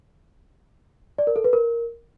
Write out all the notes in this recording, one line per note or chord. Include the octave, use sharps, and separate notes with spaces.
D5
A#4
A4
B4
A#4